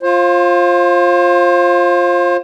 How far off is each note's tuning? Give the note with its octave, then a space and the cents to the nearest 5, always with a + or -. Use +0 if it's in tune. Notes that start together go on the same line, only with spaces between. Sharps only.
F4 +0 C5 +35